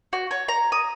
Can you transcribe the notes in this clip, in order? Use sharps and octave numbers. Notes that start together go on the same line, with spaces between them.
F#4
C#5
A#5
D#6